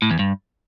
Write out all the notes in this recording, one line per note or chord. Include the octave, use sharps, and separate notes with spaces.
A2
E2
G2